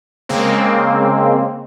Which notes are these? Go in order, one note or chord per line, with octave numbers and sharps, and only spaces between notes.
C#3 G#3 A#3 C4